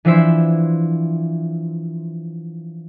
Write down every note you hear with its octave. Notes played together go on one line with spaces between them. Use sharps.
E3 F3 D4 E4 C5 E5